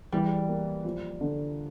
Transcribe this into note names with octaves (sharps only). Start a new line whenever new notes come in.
E3 G3
A#3
F3
D3